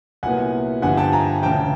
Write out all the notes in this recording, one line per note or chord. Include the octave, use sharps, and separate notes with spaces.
C2 A#2 F#3 B3 F#5 G#5
G1 G2 D3 F3 F#5 G#5
G5 A5
G#5 A#5
E1 D2 C#3 G5 A5